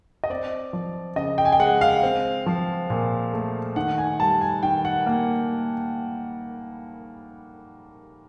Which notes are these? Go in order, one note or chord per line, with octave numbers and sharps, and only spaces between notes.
D#5
C4 D5
F3
C#3 D#5
G5
G#5
G5
G#3 F#5
F5
C4
F3
A#2
A3
D#3 F#5
G#5
G3 A5
G#5
D#3 G5
F#5
A#3